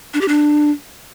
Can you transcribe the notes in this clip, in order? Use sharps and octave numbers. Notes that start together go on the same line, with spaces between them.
D4
G4
D4